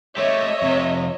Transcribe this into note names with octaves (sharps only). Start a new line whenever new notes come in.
A3 G4 C#5 D#5 E5
F2 C3